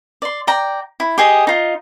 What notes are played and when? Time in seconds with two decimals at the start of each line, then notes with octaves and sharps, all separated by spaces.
0.22 D5 C6
0.47 D5 G5 A#5
1.00 E4
1.18 G4 G#4 D#5
1.47 D#4 F4